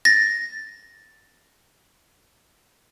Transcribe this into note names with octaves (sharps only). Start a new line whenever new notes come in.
A6 A#6